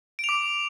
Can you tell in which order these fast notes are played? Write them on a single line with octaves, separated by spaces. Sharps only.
D7 F7 D6